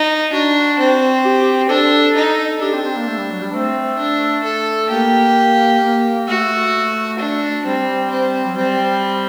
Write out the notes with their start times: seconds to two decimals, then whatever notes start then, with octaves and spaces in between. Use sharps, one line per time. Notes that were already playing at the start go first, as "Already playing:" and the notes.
Already playing: D#4
0.32 D4 F#4
0.79 C4
1.25 G4
1.69 D4 A4
2.15 D#4
2.61 D4 G4
2.73 C4
2.84 C4
2.96 A#3
3.08 A3
3.18 G3
3.30 F#3
3.42 G3
3.52 A3 C4
3.99 D4
4.44 A4
4.90 A#3 G4
5.82 A#3
6.28 A3 F#4
7.19 D4
7.65 G3 C4
8.11 C4
8.46 F#3
8.56 G3 C4